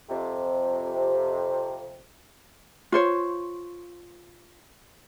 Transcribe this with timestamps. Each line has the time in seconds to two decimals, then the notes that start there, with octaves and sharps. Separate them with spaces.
0.10 F2 C3
2.92 F4 C5 C#5